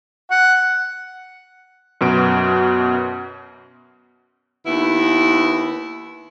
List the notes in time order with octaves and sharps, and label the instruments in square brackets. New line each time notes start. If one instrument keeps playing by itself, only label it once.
[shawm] F#5
[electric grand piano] F#2 B2 D7
[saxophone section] D#2 B3 E4